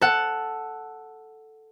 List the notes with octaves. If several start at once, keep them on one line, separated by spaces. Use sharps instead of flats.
A4 F#5